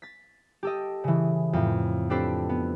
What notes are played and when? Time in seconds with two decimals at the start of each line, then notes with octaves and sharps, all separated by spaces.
0.02 A6 B6
0.63 G4 A4 D#5
1.04 C#3 E3
1.53 F2 A2
2.10 C4 D4 G4 A4 B4 C5
2.49 B3